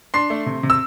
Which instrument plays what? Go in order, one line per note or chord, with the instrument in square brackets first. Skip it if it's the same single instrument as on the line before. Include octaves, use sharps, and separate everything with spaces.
[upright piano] D4 C6 C7
A3
C3
C3
E6